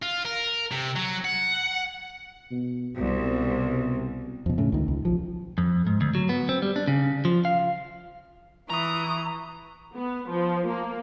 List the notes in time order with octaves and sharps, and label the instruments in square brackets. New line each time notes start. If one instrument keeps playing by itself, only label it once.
[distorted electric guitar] F4
A#4
C3
F#3
F#5
[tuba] B2
[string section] C2 [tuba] B2
[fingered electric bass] F2 B2
A2 C#3
C#2 D#3
C#2
B1 F3
[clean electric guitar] F2
G#2
D2
F#3
B3
C4
G3
D4
C#3
F3
F5
[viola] E3 [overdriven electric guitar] A#5 [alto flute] C#6 [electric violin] D#6
[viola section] B3
F3
A#3